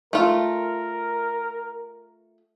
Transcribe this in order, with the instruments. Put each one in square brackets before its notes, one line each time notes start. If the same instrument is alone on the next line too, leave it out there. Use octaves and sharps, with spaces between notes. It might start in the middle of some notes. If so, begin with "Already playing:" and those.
[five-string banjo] A3 F4 [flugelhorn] A#4